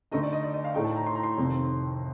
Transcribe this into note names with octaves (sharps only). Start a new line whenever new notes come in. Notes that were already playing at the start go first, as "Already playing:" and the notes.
D2 D3 A3 D#4 D#5
D5
D#5
D5
D#5
F5
A2 A3 D#4 G5
A5
A#5
C6
A#5
C6
F2 C3 D#3